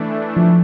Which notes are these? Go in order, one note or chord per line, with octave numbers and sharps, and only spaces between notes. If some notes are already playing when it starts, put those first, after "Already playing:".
Already playing: E3 A3 D4
F3